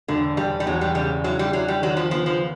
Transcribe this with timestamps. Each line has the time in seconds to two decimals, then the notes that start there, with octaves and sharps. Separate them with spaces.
0.08 E1 D3
0.37 E1 G3
0.60 G3
0.66 E2 F#3
0.81 G3
0.95 C#3 G3
1.24 F#3 E4
1.39 G3
1.53 F#3 E4
1.68 G3
1.82 D#3 F#3
1.97 F3
2.11 F3 B3
2.26 F3